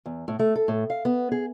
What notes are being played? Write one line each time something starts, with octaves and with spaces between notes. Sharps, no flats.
E2
A2
A3
A4
A2
F5
B3
G#4